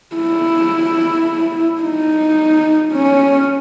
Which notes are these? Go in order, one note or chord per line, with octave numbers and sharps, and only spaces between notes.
E4
D#4
C#4